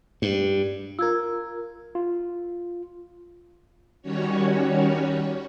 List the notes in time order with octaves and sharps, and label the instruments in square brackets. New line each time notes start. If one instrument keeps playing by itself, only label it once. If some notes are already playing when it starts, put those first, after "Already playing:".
[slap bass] G2
[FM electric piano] F4 A#4 [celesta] E6 G#6
[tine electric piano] F4
[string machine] D#3 G3 C#4 F#4 C#5